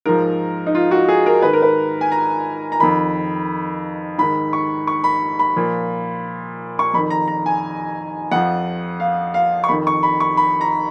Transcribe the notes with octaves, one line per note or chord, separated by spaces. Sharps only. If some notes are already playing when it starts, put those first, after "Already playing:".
G#2 F3 A#4
D#4
F4
F#4
G#4
A#4
G#2 D#3 B4
A#4
B4
G#5
A#5
A#5
F2 D#3 B5
G#2 D#3 B5
C#6
C#6
B5
B5
A#2 F3
C#6
F2 D#3 B5
A#5
A#5
G#5
F2 F3 F#5
F5
F5
C#6
F2 D#3 B5
C#6
B5
C#6
B5
A#5